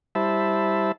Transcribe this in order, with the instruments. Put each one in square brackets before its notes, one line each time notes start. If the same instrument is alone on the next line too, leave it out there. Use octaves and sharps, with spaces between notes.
[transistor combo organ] G3 E4 C5 E5 A5 B5